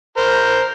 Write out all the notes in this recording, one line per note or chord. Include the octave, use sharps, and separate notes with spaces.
A#4 C5